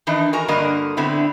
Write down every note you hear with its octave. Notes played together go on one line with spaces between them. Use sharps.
D#3 E3 D4 D#4
F#4 A#4 G#5 A#5
G2 D3 A#3 F#4 A#4 D#5
A2 D3 B3 C4 E4